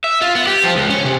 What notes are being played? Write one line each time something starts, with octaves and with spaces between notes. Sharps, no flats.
E5
F4
B3
G4
F3
C#2
C#4
C3